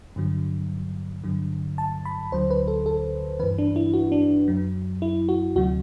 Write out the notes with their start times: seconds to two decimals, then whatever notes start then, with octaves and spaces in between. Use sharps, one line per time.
0.16 G2 D3 F#3
1.24 G2 D3 F#3
1.78 A5
2.05 B5
2.32 D2 D3 F#3 C5
2.50 B4
2.68 A4
2.86 A4
3.39 G2 E3 B4
3.58 D4
3.76 E4
3.94 F#4
4.12 D4
4.48 F#2 F#3
5.02 E4
5.29 F#4
5.56 D2 C3 F#3 F#4